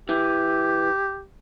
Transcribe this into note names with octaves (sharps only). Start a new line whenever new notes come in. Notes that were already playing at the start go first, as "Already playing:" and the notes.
E3 G4